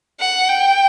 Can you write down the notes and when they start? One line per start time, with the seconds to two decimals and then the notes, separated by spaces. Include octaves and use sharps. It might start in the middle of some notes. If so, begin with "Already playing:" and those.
0.20 F#5
0.48 G5